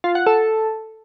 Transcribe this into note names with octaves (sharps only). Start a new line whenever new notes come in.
F4
F#5
A4